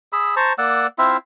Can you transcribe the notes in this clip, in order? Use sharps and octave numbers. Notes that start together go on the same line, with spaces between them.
G#4 B5 E6
C5 A5 A#5 C#6
A#3 D5 F#5 E6
C4 E4 F4 E5